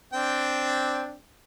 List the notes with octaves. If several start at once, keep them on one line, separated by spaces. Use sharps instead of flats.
C4 D4 G5